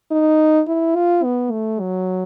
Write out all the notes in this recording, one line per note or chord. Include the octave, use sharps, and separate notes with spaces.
D#4
E4
F4
B3
A3
F#3